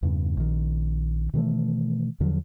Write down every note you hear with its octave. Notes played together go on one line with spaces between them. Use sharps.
E2 G2 C#3
A#1 D#3
B2 D#3 E3 A3
E2 D3 F3 F#3